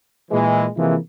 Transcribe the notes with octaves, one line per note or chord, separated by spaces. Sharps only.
A#2 E3 G#3
C3 E3 F3 G#3 A#3 E4